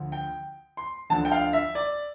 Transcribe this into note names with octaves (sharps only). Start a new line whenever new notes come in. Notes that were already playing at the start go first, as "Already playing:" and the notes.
Already playing: D2 F3
G5
C6
D2 D3 F3 A5
G5
F5
E5
D5